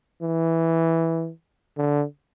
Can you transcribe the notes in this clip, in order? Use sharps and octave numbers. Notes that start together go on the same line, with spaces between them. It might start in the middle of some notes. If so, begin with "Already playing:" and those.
E3
D3